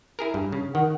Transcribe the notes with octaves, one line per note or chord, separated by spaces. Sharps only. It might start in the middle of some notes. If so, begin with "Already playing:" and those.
E4 G#4 A#4
G2
C#3
D#3 F#5